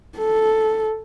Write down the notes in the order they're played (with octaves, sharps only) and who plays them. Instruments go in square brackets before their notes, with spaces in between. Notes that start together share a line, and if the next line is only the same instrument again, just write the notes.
[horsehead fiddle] A4